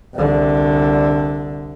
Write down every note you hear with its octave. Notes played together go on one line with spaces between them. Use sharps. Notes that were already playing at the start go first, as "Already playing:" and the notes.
C2 D3